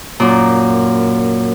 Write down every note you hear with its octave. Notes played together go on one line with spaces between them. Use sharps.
F#2 A#2